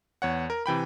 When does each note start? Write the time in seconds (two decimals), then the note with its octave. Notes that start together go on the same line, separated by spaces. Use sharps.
0.22 E2 C#5 F#5
0.50 A#4
0.66 C3 E3 G5 B5